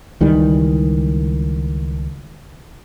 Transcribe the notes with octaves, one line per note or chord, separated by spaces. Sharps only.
C#2 D#3 E3 G3